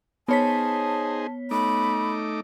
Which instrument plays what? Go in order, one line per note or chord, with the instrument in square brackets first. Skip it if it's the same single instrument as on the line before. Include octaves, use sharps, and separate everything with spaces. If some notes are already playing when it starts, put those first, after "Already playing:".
[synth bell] B3 C#5 B6 [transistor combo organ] D#4 G#4 C5 [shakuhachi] A5
[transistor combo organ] A3 D#4 D6 [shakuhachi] B5